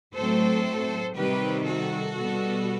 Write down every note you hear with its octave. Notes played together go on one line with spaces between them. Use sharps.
A2 F#3 A3 C4 A4 C5
C3 D#3 G3 C4 G4 B4
F#4 A4
B2 G3 B3